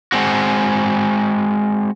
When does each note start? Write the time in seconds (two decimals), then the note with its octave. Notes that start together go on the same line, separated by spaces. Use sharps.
0.12 G#3 C4 F#4